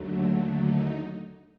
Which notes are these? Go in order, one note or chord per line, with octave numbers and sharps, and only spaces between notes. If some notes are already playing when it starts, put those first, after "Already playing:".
Already playing: D#2 D3 F#3 A3
D4
D#4